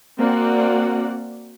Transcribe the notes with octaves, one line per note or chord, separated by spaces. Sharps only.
A#3 C4 F#4 D5 F#5